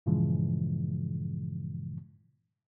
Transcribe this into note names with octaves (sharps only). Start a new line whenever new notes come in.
G2 A#2 C#3 E3 F3 G#3